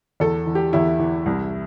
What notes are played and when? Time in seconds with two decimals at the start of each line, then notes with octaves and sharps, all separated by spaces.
0.20 E2 A4
0.46 E3
0.55 G4
0.73 E2 E4
1.00 E3
1.26 C2